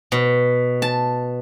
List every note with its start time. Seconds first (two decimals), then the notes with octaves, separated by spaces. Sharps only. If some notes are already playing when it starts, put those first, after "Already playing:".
0.12 B2
0.82 A5